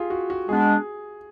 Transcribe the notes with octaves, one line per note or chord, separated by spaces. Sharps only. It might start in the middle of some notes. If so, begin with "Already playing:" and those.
Already playing: F4 G4 G#4
F#4
F#4
G#3 B3 D4 G#4